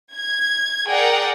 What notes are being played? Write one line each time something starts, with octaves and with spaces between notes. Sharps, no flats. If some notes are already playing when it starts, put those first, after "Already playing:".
G#6
G#4 A#4 D5 F#5 G5